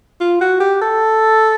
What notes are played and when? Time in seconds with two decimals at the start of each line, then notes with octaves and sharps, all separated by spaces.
0.21 F4
0.41 F#4
0.60 G4
0.81 A4